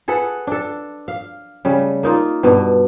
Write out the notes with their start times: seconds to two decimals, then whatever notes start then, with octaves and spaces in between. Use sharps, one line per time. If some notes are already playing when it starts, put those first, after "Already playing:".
0.08 G#4 A4 B4 F#5
0.47 D4 A4
1.08 F5
1.65 C#3 G3 A3
2.03 A#3 D#4 F4
2.43 G2 B2